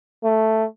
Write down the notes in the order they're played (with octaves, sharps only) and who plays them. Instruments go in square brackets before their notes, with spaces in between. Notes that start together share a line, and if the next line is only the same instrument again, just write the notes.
[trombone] A3